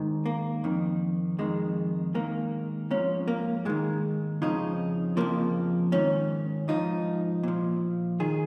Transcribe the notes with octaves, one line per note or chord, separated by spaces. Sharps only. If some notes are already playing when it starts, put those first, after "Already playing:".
Already playing: G#2 D#3
A#3
F2 D#3
F2 D#3 G#3
G#2 D#3 A#3
G#2 F3 C#4
A#3
G#2 D#3 G#3
F2 C#3 F3 D#4
F2 C#3 F3 A#3
G#2 D#3 C#4
G#2 F3 D#4
A#2 F3
D#3 G#4